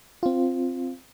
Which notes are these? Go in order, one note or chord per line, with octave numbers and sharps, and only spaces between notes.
C4 F4